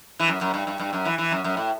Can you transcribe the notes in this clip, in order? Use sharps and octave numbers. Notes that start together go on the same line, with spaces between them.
E3
F#2
F#2
G2
G2
G2
F#2
E3
E3
F#2
F#2
A2